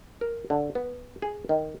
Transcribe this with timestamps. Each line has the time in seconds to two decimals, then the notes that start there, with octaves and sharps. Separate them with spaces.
0.21 A#4
0.50 D3
0.75 B3
1.22 G#4
1.49 D#3